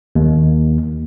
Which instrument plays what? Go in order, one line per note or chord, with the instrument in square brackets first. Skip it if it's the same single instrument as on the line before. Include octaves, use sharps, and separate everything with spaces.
[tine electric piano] D#2